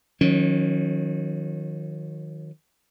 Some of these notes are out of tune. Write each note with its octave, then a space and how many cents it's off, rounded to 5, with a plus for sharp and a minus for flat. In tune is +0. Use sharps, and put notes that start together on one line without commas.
D#3 +0 F#3 -40 C#4 +0